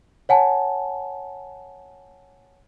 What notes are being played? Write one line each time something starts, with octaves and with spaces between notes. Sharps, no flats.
C#5 F#5 G#5 A5